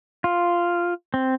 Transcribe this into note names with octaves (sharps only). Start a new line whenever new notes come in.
F4
C4